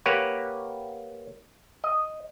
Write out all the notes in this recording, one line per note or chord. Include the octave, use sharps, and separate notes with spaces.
A#3 G4 B4 C#5 F#5
D#5